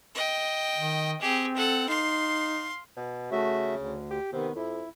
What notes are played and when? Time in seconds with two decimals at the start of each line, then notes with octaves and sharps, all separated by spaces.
0.15 D#5 G5
0.78 D#3
1.21 C4 G4 G#4
1.56 A4 F#5
1.89 D#4 F5 C6
2.97 B2
3.32 C#3 A3 F#4 E5
3.77 D2
4.11 G4
4.33 C3 D#3 B3
4.55 F2 E4